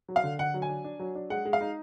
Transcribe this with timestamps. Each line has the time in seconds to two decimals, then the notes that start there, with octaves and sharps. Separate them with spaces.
0.09 F#3
0.16 F5
0.24 D3
0.39 D3 F#5
0.54 F#3
0.62 G#5
0.69 D4
0.84 D4
0.99 F#3
1.15 D4
1.30 G#3 F#5
1.45 G#3
1.53 F5
1.61 D#4